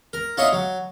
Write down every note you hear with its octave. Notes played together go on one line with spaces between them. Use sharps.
A#4
D#4 F4 C#5 E5 C#6 D#6
F#3